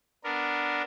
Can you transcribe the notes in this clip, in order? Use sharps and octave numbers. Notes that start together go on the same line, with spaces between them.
B3 D4 A#4